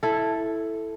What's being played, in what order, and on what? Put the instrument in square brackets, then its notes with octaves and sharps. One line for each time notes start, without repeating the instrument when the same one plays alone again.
[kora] E4 A4